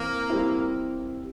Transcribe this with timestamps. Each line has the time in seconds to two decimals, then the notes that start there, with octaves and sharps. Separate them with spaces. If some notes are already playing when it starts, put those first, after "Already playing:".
Already playing: E3 A#3 C4
0.30 G3 C4 E4